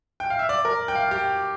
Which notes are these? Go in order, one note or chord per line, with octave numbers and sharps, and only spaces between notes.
G5
F5
E5
D5
A#4
G5
F5
G4